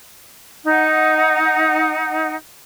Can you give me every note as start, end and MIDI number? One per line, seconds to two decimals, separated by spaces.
0.64 2.35 63
0.64 2.35 78